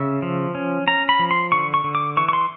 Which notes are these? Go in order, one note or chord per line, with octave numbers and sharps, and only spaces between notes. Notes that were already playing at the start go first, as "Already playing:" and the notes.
Already playing: C#3 E5
F3
C#4
C#4 A#5
B5
F3
C6
D3 C#6
C#6
D3
D6
E3 C#6
C#6
C6